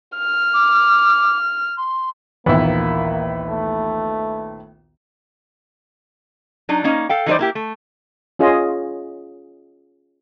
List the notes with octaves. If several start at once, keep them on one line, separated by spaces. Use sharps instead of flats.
F6
D6
C6
A#1 D#2 E3 A#3 B3 E4
A3
F#3 D4 D#4
A#3 C#4 D#4
A4 F5 G5
E3 G3 D#4 G#4 C5 D5
A#3 E4 G4
A3
C#4 F4 G#4 D#5